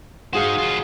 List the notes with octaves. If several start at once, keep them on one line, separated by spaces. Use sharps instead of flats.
D#4 F#4 G#4 C5 F5
D#2 F4